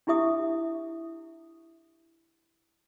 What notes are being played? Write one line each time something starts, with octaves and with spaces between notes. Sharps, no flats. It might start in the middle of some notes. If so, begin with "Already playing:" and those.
D4 E4 G4 E5 D#6